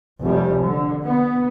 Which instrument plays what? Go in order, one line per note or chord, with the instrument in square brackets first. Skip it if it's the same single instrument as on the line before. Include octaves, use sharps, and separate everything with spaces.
[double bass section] F1 G3
D3
B3